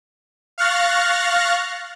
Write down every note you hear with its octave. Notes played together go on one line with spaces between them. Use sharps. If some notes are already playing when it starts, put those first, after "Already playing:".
F5 C#6 F6 F#6 A6 A#6